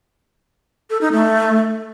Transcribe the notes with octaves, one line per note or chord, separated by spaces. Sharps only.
A4
D#4
A3